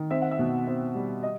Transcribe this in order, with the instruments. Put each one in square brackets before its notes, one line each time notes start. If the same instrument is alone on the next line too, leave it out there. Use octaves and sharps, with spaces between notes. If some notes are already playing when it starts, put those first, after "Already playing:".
Already playing: [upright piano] D#3
C4 E5
F#5
E5
B2
C4
G3
D#5